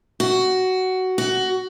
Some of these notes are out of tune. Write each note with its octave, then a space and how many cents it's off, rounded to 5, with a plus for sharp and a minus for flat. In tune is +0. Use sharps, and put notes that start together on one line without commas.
F#4 +10
F#4 +15